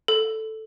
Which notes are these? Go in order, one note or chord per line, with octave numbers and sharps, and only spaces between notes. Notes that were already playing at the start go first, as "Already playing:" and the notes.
A4